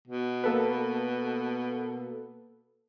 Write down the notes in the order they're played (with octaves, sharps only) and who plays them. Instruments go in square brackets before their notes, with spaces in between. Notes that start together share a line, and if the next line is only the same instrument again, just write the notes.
[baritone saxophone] B2
[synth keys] A#3 A4 B4